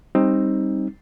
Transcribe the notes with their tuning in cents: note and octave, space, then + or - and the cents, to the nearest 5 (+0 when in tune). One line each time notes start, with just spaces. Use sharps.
G3 +20 C4 +20 D#4 +0